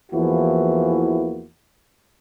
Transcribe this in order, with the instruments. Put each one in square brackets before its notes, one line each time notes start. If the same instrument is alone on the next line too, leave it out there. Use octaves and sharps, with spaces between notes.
[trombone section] E2 E3 F3 A#3 E4 F#4